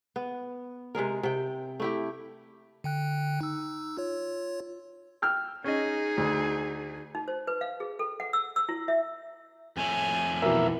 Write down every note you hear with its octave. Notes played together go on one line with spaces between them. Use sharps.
B3
C3 G#3 G#4 A#4
C3 G5
A3 E4 G4
D3 G5 F#6
D#4 E6
F4 C#5
G5 E6 F6
C#4 D#4 G#4 D#5
D2
D#4
C5
B4
F5
G#4
A4
F#5
E6
E6
E4
E5
F2 A3 C#5 G#5
B1 E3 A#4 E5